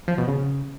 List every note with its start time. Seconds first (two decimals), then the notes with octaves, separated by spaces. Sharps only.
0.08 F3
0.18 B2
0.28 C#3